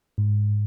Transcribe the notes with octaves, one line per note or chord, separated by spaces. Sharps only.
G#2